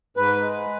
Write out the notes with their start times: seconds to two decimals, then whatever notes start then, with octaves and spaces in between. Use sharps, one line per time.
0.17 G#2 B4
0.42 G#3